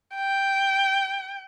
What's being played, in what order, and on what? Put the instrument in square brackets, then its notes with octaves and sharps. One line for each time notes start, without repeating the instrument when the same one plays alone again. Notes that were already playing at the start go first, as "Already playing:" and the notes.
[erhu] G5